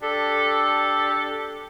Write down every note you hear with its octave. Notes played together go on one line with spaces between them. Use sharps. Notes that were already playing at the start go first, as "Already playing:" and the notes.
D4 G4 A4